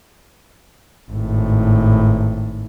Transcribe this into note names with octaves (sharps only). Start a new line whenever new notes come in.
G#1 A2